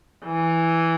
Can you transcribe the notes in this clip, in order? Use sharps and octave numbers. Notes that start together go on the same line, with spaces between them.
E3